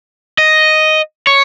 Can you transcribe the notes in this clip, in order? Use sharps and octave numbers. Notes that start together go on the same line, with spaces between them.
D#5
C#5